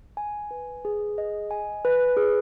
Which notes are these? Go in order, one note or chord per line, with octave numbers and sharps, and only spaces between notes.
G#5
B4
G#4
D#5
G#5
B4
G#4